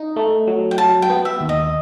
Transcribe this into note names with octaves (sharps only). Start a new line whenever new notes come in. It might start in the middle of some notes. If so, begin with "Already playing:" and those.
Already playing: D#4
A3
F#3
G5
F#3 A5
G5
B3
E5
D#2
D#5